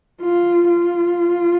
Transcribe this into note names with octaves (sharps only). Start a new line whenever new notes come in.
F4
F4